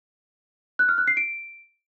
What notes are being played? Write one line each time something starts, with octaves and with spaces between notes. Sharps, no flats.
F#6
F6
F#6
C7
D7